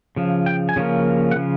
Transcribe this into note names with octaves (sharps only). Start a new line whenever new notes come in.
C#3 F3
G5
G#5
C#3 F3 A#3 C#4
F#5
C#3 F3